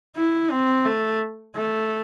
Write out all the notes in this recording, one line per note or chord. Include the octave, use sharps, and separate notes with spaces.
E4
C4
A3
A3